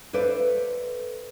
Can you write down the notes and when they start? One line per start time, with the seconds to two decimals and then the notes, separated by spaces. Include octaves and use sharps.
0.13 A4 B4 C5 D5 E5 F5